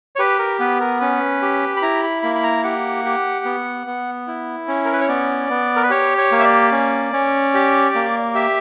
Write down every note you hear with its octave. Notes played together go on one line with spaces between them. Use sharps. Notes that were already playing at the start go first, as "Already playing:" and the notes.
C#5
G4 B4
A#4
B3 B4
A#4
C#4 B4
G4
B5
E4 A#5
B5
A#3 B5
B5
A#5
G4 F#5
G4
B3
B3
E4
C#4
A#4
B4
C#5
B3 D5
B3
A#4
B4
G4 C#5
C#5
A#3
E5
D5
C#4
C#4
G4
A#3
G4 E5